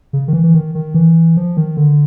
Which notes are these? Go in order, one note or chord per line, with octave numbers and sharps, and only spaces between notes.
C#3
D#3
E3
E3
D#3
D#3
E3
F3
D#3
D3